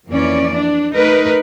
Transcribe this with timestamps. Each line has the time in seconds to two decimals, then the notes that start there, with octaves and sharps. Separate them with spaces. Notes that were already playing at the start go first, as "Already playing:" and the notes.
0.10 F2 E3 A#3 C#4 D5
0.54 D4
0.92 A3 D#4 A#4 B4